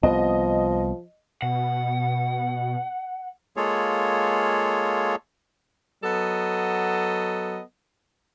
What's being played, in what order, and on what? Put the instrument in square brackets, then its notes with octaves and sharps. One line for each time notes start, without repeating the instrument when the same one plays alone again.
[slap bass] C2 B3 [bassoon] F3 [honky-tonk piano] D#5
[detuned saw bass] B2 [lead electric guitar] F#5
[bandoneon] G#3 A#3 F4 G#4 A4 C#5
[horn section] F#3 B3 A4 D#5